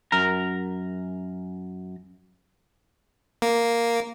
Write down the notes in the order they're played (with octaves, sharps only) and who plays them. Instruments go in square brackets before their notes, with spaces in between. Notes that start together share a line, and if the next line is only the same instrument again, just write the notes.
[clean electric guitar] F#2 A#4 A#5
[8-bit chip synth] A#3